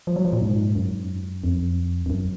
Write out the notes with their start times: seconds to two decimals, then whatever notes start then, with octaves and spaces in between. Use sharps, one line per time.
0.07 F3
0.16 F#3
0.25 F3
0.33 A#2
0.42 G#2
0.75 F#2
1.44 F2
2.06 F2
2.10 F#2